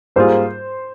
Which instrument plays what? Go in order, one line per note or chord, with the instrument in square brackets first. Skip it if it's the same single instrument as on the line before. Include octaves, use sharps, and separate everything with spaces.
[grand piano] G#2 G3 A#3 F4 G#4 [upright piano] C5